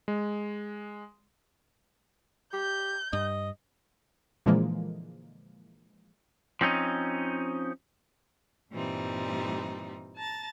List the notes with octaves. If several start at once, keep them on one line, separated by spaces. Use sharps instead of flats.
G#3
G4 G6
G2 D#5
A#2 D3 E3 F3 G#3 A#3
F3 C4 C#4 D#4
G2 A#2 E3 G3 C4 D#4
A5 A#5 A6